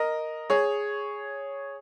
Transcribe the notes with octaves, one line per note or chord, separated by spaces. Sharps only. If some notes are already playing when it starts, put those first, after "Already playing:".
Already playing: A#4 D#5
G#4 C#5